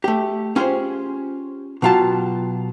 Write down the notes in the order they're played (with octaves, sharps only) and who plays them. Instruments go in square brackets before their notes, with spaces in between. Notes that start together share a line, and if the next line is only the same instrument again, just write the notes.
[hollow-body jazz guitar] A3 G4
C#4 F4 G4 G#4 C5
B2 F#3 F4 G4 A5